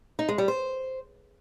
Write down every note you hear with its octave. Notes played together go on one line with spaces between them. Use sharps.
D#4
G#3
G3
C5